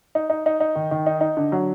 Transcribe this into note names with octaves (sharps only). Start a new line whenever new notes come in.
D#4
D#4
D#4
D#4
D#3
D#3
D#4
D#4
D3
F#3